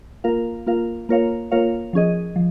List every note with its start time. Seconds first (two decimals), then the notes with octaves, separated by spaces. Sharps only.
0.24 A#3 F4 A#4 F5
0.66 A#3 F4 A#4 F5
1.09 A#3 F4 A#4 C#5 F5
1.51 A#3 F4 A#4 C#5 F5
1.93 F3 C#4 G#4 D#5
2.36 F3